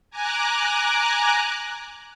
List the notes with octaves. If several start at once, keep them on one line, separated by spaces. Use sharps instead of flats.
G#5 A#5 D6 F#6